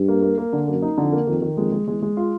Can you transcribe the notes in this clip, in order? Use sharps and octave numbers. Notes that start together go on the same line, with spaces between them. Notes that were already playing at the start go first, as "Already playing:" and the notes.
Already playing: G2
A#3
A#3
A#3
D3
F#2 A#3
D#4
F2 D3
A#3
F2 D#3
D#3
F2 G#3
G#3
E2 G#3
G#3
F4